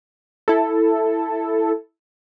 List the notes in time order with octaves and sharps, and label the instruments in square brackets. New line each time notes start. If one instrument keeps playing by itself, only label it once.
[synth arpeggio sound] E4 A4